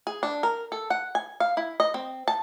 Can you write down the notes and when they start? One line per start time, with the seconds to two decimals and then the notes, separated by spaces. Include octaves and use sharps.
0.07 G#4
0.23 D4
0.43 A#4
0.72 A4
0.90 F#5
1.15 G#5
1.40 F5
1.57 E4
1.80 D#5
1.94 C4
2.28 A5